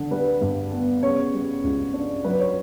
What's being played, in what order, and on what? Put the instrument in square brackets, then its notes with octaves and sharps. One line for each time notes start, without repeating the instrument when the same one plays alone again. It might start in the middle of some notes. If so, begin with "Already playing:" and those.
Already playing: [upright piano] D3
G3 B4
G2
B3
C#3 C#5
G3
C#2
D4
F#3 B4
C#5